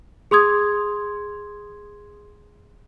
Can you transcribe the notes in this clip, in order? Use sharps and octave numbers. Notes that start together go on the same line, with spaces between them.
G#4 C6 D#6 G#6